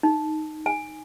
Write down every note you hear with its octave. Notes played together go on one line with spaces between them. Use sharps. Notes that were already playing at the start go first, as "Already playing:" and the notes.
D#4
G#5